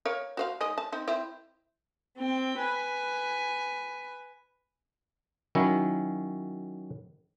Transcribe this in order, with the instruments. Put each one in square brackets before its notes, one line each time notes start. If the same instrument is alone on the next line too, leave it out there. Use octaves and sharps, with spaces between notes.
[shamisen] A#4 C#5 F5
F#4 C5 F5
G#3 D#4 D#5
A5
C4 D#4
C4 E4
[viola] C4 G5
B4 G#5
[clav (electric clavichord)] D#3 F#3 C#4 E4